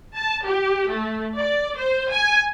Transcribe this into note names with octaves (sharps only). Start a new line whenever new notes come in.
A5
G4
A3
D5
C5
G#5